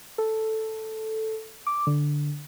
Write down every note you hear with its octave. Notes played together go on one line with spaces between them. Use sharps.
A4
D6
D3